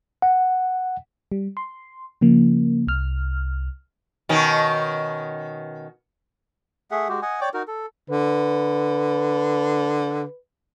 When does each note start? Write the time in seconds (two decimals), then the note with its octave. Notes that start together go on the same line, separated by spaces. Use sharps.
0.22 F#5
1.32 G3
1.57 C6
2.21 C#3 F3 A#3
2.87 C2 F6
4.29 B2 D#3 C#4
6.91 A3 G#4 E5 F#5
7.09 G#3 F#4 G4
7.22 D#5 F#5 G#5
7.41 C#5 D5 G5 D6
7.54 D#4 F#4 A#4
7.68 A4
8.10 D3 B4